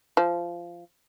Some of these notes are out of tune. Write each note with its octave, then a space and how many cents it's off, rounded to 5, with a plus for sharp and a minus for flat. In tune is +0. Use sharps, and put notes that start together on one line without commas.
F3 -15